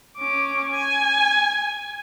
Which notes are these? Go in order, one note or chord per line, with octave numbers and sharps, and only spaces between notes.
C#4 D6
G#5